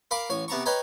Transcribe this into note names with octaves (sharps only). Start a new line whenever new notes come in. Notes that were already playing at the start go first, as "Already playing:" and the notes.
A#4 F5 B5 D6
A1 C#5 G#5
C3 B3 A5 A#5 C#6
B4 C#5 D#5 G5 G#5 A#5